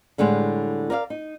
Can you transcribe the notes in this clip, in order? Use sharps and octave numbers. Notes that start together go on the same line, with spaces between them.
A2 D3 G3 G#3
A#4 D5 D#5 F5
D#4